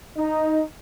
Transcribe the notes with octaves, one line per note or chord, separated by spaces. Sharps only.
D#4